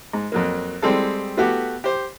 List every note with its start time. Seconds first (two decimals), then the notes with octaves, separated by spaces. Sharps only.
0.13 G#2
0.32 F2 F#3 A#3
0.82 G3 G#3 C4 G#4 A4
1.37 A3 B3 F#4 G4
1.84 G4 C5